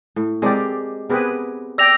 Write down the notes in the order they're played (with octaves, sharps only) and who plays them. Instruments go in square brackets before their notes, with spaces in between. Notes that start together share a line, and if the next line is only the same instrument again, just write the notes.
[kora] A2
[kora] G#3 G4 [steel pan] C4 A#4 D5
[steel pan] B3 G#4 B4 [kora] C4 G4 A#4
[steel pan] D5 G5 [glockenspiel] E6 A#6 F7